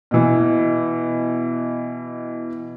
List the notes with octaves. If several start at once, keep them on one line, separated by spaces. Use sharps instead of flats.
B2 E3